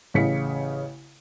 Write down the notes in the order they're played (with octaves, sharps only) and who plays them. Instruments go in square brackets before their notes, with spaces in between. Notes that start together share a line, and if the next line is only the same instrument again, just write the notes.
[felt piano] A1 C#3 B6 C#7